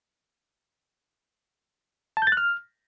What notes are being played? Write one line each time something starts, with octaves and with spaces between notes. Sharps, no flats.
A5
G6
A6
F#6
F6